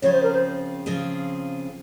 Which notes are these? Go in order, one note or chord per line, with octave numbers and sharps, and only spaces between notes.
C#3 F3 C4 F4 G#4 C#5
C5
A#4
C5
C#3 F3 C4 F4 G#4